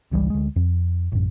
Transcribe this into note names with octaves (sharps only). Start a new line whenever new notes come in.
G#1 C#2 E3 G3
D2 G#3
F2
A1 F#2